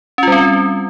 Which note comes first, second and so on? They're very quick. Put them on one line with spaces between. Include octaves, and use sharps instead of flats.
C#4 F4 G3 C4